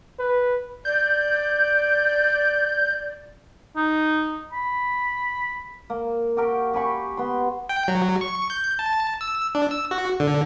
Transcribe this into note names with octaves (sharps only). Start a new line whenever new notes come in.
B4
D5 G6
D#4
B5
A#3
F#4 G4 A#4 G5
G4 G#5 B5 C#6
B3 C6
G5
F#3
C#6
G6
A5
E6
D4
E6
F#4
D3